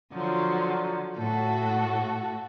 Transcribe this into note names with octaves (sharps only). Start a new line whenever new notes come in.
D3 F3 F#3
A2 F#4 A4